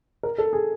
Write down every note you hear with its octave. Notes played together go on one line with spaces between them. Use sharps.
A#4
A4
G#4